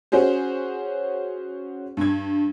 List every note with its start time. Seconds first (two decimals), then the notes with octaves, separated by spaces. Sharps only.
0.12 C#4 F#4 G#4 C5
1.97 G2 G#6